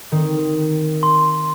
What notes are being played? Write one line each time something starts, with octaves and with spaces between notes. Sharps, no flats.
D#3 C4
C6